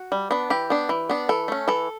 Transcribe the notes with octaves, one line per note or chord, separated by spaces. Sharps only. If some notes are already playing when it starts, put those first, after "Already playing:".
Already playing: F#4
G3
B3 D4
E3 G4
B3 D4
E3
B3 D4
E3 A4
A3 C#4
E3 A4